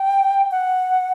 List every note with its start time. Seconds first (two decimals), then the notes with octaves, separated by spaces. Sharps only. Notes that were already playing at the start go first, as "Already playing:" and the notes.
Already playing: G5
0.51 F#5